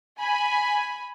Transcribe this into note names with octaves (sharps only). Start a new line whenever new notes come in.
G#5 B5